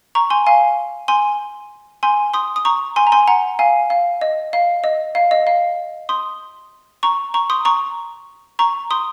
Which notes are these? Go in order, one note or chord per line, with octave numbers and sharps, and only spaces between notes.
A#5 C#6
G#5 C6
F5 G#5
G#5 C6
G#5 C6
C6 D#6
D#6
A#5 C#6
G#5 C6
A#5
G#5 C6
F#5 A#5
F5 G#5
F5
D#5
F5
D#5
F5
D#5
F5
C6 D#6
A#5 C#6
A#5 C#6
C6 D#6
A#5 C#6
A#5 C#6
C6 D#6